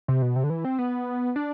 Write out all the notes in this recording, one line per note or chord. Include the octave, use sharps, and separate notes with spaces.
C3
B2
C3
D3
E3
C4
B3
D4